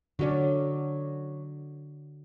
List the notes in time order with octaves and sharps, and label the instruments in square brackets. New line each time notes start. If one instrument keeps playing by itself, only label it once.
[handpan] D3 F#4 D5 [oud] F#3 C#4 D4